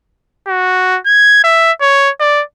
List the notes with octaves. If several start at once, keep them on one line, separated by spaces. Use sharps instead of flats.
F#4
G#6
E5
C#5
D5